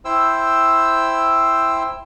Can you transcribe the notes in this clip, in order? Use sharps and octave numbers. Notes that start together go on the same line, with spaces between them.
E4 C5 G5 E6